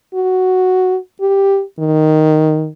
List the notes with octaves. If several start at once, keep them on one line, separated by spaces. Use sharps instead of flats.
F#4
G4
D#3